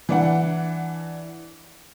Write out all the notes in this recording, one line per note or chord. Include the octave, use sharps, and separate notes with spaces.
E3 D4 F#5